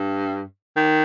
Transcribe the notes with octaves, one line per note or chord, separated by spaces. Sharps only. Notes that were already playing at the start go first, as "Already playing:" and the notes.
Already playing: G2
D#3